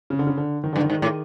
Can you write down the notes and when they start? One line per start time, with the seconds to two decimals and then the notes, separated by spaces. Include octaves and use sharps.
0.10 C#3
0.19 D3
0.27 C#3
0.37 D3
0.64 D#3
0.73 G2 D3
0.82 D#3
0.90 G#2
1.02 A2